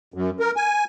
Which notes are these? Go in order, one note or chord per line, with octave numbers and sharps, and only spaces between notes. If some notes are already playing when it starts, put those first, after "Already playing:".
F#2
A#4
G#5